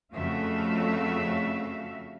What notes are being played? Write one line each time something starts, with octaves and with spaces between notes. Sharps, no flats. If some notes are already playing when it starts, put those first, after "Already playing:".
F2 C#3 A3 F#4 E5 F5